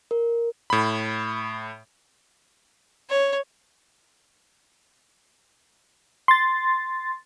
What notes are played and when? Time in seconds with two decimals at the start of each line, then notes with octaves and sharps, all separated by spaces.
0.11 A#4
0.70 A2 B5
3.10 C#5
6.28 C6 A6